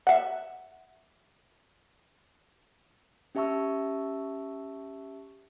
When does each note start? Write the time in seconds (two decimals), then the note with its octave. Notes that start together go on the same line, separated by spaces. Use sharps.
0.07 E5 F#5
3.35 C#4 G4 E5 A5 C#6 E6